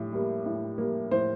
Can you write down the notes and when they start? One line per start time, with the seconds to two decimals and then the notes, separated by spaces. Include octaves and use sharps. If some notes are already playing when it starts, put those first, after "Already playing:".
Already playing: A2 G3 G4
0.13 G3 A#3
0.46 A2
0.78 G3 A#3
1.11 A2 C5